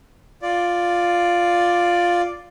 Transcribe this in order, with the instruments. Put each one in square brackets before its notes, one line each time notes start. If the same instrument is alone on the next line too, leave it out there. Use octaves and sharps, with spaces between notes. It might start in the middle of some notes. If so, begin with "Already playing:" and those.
[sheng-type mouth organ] F4 D5